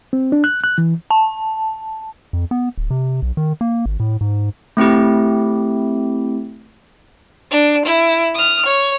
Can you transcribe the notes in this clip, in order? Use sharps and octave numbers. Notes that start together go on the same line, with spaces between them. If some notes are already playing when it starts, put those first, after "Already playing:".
C4
D4
F#6
F#6
E3
A5
F2
B3
D1
C3
B1
D#3
A#3
G#1
A2
G#2
A3 C4 E4 G4
D4
E4
D#6 F6
C#5